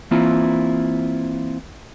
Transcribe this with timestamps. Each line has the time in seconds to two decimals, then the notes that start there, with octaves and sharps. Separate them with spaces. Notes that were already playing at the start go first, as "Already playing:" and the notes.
0.11 E3 A#3 C4 E4 F4